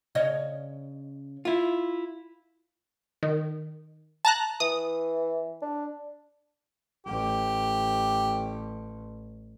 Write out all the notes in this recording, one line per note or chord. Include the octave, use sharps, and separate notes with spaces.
C#3 C#5 D#5
E4 F4
D#3
A5 A#5 F#6
E3 D#6
D4
A1 G4